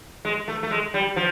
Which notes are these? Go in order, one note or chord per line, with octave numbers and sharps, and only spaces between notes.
G#3
A3
A3
G#3
G3
F3